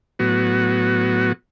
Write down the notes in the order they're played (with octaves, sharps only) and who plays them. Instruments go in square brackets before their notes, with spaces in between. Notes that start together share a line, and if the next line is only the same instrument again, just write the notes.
[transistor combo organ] A2 F#3 B3 F#4